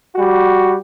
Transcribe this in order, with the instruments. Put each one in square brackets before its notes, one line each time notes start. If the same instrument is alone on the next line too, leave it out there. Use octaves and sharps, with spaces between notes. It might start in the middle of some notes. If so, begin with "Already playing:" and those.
[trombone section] G3 F#4